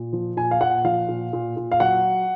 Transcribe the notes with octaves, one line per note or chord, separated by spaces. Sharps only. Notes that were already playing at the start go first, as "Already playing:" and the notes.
Already playing: A#2
F3
A#2 G#5
F5
A#2 F#5
F3 F5
A#2
A#2
A#2
F5
F#3 F#5